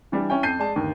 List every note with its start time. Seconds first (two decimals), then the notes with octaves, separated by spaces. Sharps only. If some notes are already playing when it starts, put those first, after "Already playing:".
0.12 E3 G3 D4
0.30 C#4 E4 G5
0.43 F2 A5 G6 C7 D#7
0.59 G#3 D5 A5
0.76 G1 D#2